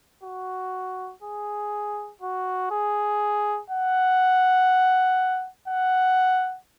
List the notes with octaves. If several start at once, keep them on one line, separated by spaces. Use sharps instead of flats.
F#4
G#4
F#4
G#4
F#5
F#5